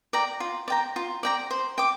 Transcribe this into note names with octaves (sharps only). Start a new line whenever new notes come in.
D5 G5 A#5
F4
D5 G5 A#5
F4
D5 G5 A#5
C5
G5 D6